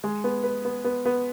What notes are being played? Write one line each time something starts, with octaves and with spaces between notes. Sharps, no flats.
G#3
B3
B4
B3
B3
B3